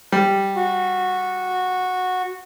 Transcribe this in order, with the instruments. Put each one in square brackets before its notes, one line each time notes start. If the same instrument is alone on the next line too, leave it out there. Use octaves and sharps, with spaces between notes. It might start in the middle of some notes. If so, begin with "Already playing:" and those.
[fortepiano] G3
[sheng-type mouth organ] F#4